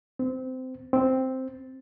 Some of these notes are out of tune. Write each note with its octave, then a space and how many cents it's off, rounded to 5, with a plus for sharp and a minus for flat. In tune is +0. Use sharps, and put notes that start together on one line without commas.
C4 -20
C4 +0